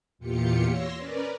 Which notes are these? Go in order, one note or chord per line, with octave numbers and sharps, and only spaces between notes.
E2 A#2 F4 G4 C#7
C#5 C6 E6 A#6
C#4 A#4 B4 D5